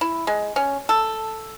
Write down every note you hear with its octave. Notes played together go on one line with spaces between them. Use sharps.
E4
G#3
C#4
A4